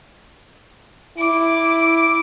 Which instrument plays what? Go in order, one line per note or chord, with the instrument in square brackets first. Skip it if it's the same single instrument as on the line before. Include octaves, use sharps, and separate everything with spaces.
[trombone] E4 [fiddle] D6